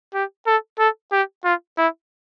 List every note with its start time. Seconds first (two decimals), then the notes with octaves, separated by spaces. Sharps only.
0.14 G4
0.47 A4
0.79 A4
1.12 G4
1.44 F4
1.78 E4